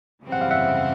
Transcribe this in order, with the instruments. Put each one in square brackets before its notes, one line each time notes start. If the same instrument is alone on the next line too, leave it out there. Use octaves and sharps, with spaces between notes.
[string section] F#2 C#3 E3 G3 C4
[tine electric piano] F#5
F5
E5 F#5